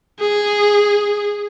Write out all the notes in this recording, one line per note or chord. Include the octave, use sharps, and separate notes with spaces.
G#4